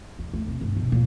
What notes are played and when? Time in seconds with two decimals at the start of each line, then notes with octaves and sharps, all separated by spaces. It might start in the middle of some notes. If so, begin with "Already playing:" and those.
0.19 G3
0.33 A3
0.48 C3
0.61 G1
0.77 B2
0.92 A#2